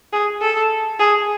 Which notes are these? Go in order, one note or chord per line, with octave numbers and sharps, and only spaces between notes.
G#4
A4
G#4